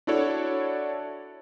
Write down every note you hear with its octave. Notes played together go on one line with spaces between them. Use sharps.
D4 E4 F#4 A4 C#5 D5